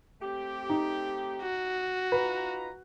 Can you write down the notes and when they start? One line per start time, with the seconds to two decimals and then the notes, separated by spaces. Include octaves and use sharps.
0.21 A3 C4 G4
0.70 D#4
1.42 F#4
2.12 D#4 F4 B4 A#5